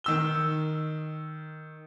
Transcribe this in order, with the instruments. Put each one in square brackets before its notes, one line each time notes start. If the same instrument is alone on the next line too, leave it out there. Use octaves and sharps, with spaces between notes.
[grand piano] D#3 E6 G7